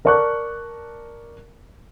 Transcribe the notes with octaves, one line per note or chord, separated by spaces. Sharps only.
A#4 D5 A5 C#6 D6 F#6